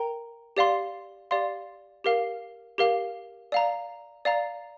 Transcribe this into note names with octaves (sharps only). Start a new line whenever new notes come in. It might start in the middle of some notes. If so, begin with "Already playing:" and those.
Already playing: A#4 G5 A#5
G4 D5 F5 C6
G4 D5 F5 C6
G4 A#4 F5
G4 A#4 F5
D5 F5 A#5
D5 F5 A#5